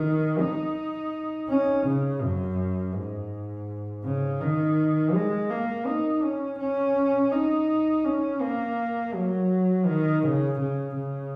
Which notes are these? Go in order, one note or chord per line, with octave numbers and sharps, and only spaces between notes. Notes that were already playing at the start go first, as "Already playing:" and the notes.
Already playing: D#3
D#4
C#4
C#3
F#2
G#2
C#3
D#3
G#3
A#3
D#4
C#4
C#4
D#4
C#4
A#3
F#3
D#3
C#3
C#3
C#3